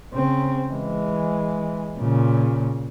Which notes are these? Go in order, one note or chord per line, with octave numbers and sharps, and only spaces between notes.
C#3 C4
E3 G#3
A#2 C#3